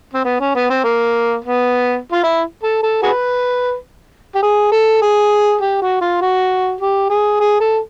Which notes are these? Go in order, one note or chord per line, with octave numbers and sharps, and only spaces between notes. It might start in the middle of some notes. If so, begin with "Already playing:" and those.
C4
B3
C#4
B3
C4
A#3
B3
F4
E4
A4
A4
F#4 G#4 B4
G4
G#4
A4
G#4
G4
F#4
F4
F#4
G4
G#4
G#4
A4